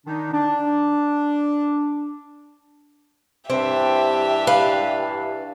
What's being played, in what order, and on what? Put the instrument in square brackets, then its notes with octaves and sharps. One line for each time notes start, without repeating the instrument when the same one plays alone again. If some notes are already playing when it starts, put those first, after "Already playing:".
[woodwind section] D#3 D4 D#4
D4
[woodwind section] G2 E3 D4 [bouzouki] C4 [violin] G4 E5
[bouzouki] B4 [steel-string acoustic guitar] F5